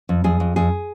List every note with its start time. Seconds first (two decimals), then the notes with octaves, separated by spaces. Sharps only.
0.09 F2
0.24 F2 G#4
0.40 F2
0.56 F2 G#4